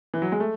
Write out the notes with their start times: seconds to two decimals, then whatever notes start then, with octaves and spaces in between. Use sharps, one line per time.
0.14 E3
0.22 F#3
0.32 G#3
0.40 A3